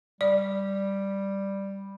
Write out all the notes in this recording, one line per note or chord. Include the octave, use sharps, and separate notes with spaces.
G3 D5